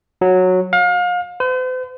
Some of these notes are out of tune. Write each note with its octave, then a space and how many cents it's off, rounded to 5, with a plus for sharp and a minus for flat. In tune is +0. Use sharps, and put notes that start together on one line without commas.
F#3 -10
F5 +35
C5 -45